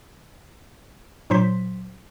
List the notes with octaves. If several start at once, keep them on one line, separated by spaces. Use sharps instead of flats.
G2 A#2 F#3 C5 C6 B6